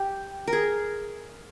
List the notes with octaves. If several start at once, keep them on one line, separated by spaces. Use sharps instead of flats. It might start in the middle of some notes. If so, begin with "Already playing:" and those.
Already playing: G4
A#4
G#4